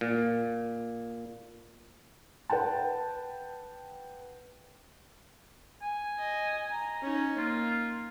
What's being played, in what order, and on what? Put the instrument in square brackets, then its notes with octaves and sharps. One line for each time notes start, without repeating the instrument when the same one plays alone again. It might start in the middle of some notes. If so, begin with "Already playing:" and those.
[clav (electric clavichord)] A#2
[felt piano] B4 F#5 G5 A5
[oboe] G#5
[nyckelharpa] D#5
A#5
C#4 D#4
[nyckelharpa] A#3 [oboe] F4